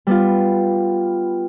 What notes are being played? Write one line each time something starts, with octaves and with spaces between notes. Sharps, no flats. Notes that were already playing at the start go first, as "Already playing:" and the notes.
G3 B3 F4